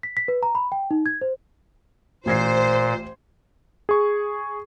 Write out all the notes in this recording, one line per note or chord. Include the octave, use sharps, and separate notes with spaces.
B6
B6
B4
A#5
B5
G5
D#4
G#6
C5
A1 A#2 C5 G#6 C7
G#4 C#6